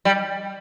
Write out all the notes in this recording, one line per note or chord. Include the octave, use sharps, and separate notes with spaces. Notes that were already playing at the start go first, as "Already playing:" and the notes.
G3